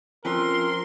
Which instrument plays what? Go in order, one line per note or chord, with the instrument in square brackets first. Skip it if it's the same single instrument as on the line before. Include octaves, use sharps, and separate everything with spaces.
[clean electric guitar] F3 [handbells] C4 C#4 A4 [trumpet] A#4 [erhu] C6